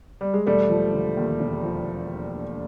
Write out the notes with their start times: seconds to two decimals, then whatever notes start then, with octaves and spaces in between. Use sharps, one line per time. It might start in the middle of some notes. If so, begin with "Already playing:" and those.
0.21 G3
0.34 G#3
0.46 E1 G3 A3
0.69 F3
0.93 D3
1.17 D#2
1.40 E1
1.63 F3